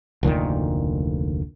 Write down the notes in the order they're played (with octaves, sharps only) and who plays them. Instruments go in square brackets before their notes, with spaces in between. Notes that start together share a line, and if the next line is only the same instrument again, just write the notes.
[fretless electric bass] F1 D2 A#2 D#3